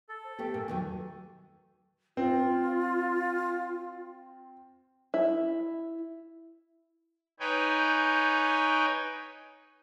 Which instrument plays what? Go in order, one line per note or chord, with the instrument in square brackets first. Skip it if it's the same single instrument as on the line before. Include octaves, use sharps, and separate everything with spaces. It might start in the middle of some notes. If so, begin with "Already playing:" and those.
[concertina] A4
[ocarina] C5
[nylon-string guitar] A3 B3 G4 [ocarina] G5
[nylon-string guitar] A#2
E2 D#3 F#3
[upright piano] C4 [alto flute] F4
[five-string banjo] E4
[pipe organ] D#4 B4 C#5 G5 G#5